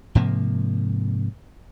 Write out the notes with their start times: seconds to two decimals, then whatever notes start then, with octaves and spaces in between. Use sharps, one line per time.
0.15 G#2 C3 F3 A#3